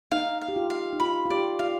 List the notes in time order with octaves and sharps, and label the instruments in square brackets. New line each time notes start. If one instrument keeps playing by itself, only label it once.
[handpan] D#4 [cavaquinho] F5
[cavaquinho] F5
[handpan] G4
F4
[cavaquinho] F5
[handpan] D#4
[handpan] F4 [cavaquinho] B5
[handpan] F4
[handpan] G4 [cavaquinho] D5
[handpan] F4 [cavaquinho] F5